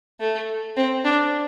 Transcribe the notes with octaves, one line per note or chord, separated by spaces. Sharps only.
A3
C4
D4